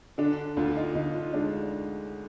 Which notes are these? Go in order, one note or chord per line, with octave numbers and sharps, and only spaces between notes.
D3 D4
D2 F4
F4
D#4
D2 D#4
F4
G#3 D4